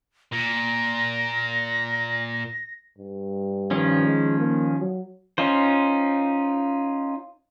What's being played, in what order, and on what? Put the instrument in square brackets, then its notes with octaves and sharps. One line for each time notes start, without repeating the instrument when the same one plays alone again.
[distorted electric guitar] A#2 [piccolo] A#6
[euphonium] G2
[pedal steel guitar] D#3 F3 C#4
[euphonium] G#3
A#3
F#3
[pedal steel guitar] C#4 D#4 F4 C5